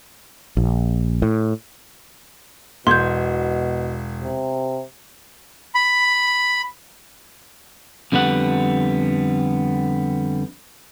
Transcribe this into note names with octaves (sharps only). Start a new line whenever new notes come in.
A#1
A2
E1 B2 C6 G6 G#6
C3
B5
F2 D3 G3 B3 F#5